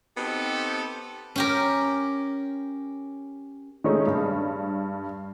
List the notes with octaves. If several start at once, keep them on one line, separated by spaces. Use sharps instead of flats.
B3 C4 D#4 G4 A4
C#4 G4 A#4
D#3 G#3 A3 C#4 D#4
G2